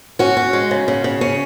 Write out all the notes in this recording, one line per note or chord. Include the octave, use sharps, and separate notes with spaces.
C#4 F#4
C#4
G#3
C#3
C#3
C#3
C#4